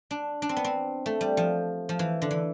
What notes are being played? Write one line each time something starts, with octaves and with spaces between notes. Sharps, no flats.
D4
D4
C4
B3
C4
A3
G3
F3
F3
E3
D3
E3